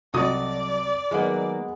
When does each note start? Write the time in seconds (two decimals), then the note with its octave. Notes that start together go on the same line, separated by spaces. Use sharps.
0.14 C2 F#3 F#4 A4 D5 D#5 D#6
1.11 D#3 F#3 G#3 A#3 B3 B4 E5